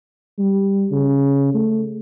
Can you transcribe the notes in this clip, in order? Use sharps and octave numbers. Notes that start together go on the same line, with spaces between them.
G3
C#3
A3